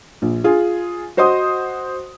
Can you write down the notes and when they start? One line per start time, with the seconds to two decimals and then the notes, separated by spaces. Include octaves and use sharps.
0.22 A#1
0.44 F4 G#4
1.17 F#4 C5 D#5 C6 D#6